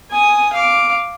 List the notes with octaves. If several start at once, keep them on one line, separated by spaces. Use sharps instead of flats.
G#5 D#6
F5 D6